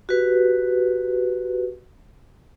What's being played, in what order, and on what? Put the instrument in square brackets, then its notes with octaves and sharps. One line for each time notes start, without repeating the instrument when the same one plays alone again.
[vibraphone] F#4 G4 B4